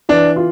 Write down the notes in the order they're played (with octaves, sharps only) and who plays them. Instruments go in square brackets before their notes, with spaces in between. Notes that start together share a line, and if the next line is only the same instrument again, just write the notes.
[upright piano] E3 [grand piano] D4
[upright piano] F4